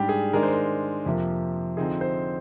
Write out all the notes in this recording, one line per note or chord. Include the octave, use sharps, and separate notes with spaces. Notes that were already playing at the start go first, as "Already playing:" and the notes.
Already playing: G#2 G3 D4 G4
G#4
D#3 G#3 D4 A#4
C5
A#4
F2 C3 F3 A#3
D3 F3 C4 D#4 G#4
C5